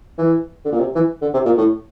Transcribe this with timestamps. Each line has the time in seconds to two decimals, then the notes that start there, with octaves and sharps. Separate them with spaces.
0.18 E3
0.65 D3
0.72 A#2
0.80 C3
0.95 E3
1.22 D3
1.33 C3
1.45 A#2
1.57 A2